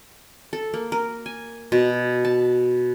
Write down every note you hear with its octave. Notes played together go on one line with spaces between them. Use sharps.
A4
A#3
A#4
G#5
B2
A5